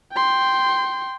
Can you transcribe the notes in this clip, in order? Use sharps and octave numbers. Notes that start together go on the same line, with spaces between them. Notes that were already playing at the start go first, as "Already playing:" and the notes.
G5 C6